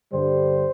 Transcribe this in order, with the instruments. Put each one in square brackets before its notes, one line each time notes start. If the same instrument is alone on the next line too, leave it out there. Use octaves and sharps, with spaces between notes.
[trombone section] G2 D3 G3 C5